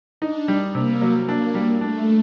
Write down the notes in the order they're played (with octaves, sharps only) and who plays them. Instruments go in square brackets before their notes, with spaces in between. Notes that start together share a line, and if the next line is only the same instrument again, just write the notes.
[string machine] D4 [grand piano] D#4
[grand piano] G3
[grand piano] C3 [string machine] A#3
[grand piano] F#3
[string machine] A#3 [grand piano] D4
[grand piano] G3
[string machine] A3 [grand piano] D4